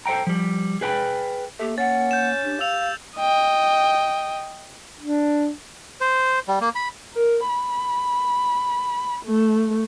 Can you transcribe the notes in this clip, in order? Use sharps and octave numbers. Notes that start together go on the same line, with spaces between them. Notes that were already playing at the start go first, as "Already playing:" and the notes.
A4 C5 F5 G5 A#5
F3 G3
G#4 B4 G5 B5
A3 A#3 G4
C#4 F#5 A6
G6 E7
D4 G4
F5 E6 F7
D#5 G5
D4
C5
G3
A#3
B5
A#4
B5
A3